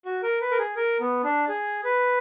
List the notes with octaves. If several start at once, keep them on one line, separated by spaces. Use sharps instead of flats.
F#4
A#4
B4
A#4
G#4
A#4
B3
D4
G#4
B4